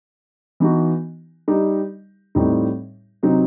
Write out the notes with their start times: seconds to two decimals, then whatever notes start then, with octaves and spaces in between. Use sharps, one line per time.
0.60 E3 B3 D#4 F#4
1.48 G3 D#4 G4
2.35 A2 G3 C4 D#4
3.23 C3 F#3 C4 D#4